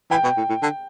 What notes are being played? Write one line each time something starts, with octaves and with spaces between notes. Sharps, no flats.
E3 G5
B2
A2
A2
D3